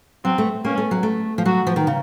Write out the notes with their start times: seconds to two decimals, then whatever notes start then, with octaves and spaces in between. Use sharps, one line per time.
0.25 F#3 C4
0.38 A3
0.64 A#3 C#4
0.77 A3
0.91 F#3
1.03 A3
1.38 F3
1.46 F#3 F#4
1.67 F3
1.76 D#3
1.87 C#3